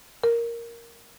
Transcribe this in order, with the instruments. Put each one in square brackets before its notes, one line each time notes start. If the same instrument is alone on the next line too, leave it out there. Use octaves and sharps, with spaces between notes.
[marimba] A#4